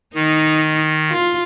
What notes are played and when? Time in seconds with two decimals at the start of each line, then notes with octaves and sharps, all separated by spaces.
0.15 D#3 D#4
1.11 F4